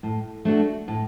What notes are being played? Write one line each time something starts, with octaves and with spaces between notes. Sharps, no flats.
A2
A3 D4 F#4
A2